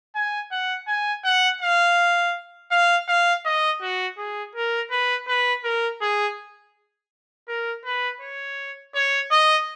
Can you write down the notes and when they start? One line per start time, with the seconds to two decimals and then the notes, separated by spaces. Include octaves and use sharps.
0.15 G#5
0.51 F#5
0.87 G#5
1.24 F#5
1.62 F5
2.71 F5
3.08 F5
3.45 D#5
3.81 F#4
4.17 G#4
4.55 A#4
4.91 B4
5.28 B4
5.64 A#4
6.01 G#4
7.48 A#4
7.85 B4
8.21 C#5
8.95 C#5
9.31 D#5